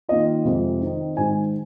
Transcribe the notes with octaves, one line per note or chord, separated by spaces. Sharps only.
D#3 A#3 F4 D#5
F2 C3 F3 G#3
D#3 C4 D#4
G#2 D#3 G#3 G#5